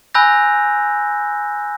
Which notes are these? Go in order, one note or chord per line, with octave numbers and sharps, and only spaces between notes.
G#5 B5 E6 F#6 G6 A#6